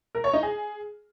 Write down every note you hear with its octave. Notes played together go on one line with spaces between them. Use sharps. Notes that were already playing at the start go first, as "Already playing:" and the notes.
A#4
C#5
D#4
G#4